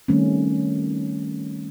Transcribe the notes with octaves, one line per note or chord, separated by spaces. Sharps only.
D#3 G3 A3 C4 C#4